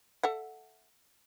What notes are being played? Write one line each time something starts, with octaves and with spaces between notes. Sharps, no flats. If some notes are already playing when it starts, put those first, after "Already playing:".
A4 E5 F#5